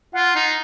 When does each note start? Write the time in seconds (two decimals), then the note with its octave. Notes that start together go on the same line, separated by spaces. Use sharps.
0.14 F4 F#5
0.35 D#4